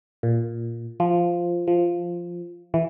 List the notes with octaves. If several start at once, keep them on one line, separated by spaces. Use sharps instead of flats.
A#2
F3
F3
E3